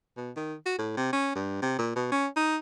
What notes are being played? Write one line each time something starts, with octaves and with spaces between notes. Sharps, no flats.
B2
D#3
F#4
A2
C3
C#4
G2
C3
A#2
B2
C#4
D#4